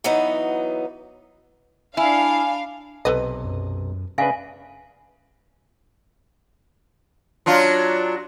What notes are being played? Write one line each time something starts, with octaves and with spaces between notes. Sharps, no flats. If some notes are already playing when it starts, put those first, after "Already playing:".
E3 F#3 B3 D#4
D4 E4 F5 G#5
B1 C3 A4 B4 D#5
F#2
C#3 D4 B4 E5 F5 G#5
F#3 D4 F4